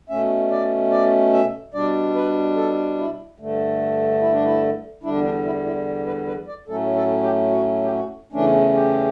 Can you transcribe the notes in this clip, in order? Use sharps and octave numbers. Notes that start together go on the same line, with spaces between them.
B2 A3 C#4 E5
D5
D5
E5
B2 G3 D4 D5
B4
A4
E4
G2 D3 A3
E4
D4
E4
E2 D3 G3 D4 E4
D4
E4
E4
B4
B4
D5
A2 F#3 A3 C#4 A4
A4
G4
F#4
G4
F#4
E2 C#3 E3 A3 C#4 D4
G4